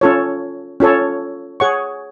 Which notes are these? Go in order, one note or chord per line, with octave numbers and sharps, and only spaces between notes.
C#4 F4 A4 C#5
C#4 F4 A4 C#5
G#4 C#5 F#5 C#6